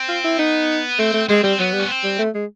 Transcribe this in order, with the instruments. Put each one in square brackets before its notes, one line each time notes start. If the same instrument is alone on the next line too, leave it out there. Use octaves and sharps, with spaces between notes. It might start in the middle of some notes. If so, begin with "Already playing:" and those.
Already playing: [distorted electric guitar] C4
[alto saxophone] F4
E4
[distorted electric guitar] B3 [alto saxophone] D#4
[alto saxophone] A3 [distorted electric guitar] C4
[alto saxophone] A3
[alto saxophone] G#3 [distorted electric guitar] C4
[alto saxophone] G3 [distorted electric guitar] C4
[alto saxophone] F#3 [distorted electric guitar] B3
[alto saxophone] G3
[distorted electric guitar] C#4
C4
[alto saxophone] G3
A3
G#3